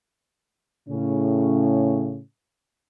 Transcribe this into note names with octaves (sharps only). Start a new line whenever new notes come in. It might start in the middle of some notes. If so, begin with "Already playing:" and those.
A2 C#3 C#4